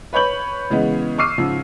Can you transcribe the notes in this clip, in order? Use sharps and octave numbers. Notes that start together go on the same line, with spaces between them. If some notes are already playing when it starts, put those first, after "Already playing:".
B4 C#5 B5 G6 F#7
C#3 E3 G#3 B3
C#6 D6 E6 F6 C7 D#7
G#2 C#3 F3